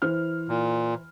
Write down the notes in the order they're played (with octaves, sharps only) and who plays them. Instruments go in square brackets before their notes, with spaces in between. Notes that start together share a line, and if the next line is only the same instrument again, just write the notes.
[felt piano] E3 C5 F6
[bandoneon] A#2